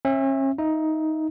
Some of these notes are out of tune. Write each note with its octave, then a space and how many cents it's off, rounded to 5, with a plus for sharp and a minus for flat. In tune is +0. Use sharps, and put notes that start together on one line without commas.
C#4 -40 E5 +0
D#4 +10 E5 +15